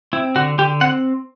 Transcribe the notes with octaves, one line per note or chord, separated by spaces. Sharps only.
C4 E4
D3 F#4
D3 G4
C4 F#5